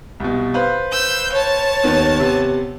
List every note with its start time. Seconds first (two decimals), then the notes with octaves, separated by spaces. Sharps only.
0.20 C2 B2
0.54 B4 C5 F5
0.92 E6 G6
1.33 C#5 A5
1.83 D#2 D#3 B3
2.20 C3 B3